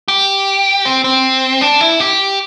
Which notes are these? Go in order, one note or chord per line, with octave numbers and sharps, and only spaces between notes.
G4
C4
C4
D4
E4
G4